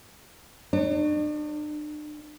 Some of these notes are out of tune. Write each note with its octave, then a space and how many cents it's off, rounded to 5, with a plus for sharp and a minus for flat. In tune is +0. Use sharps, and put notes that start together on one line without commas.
D4 +40 C#5 +0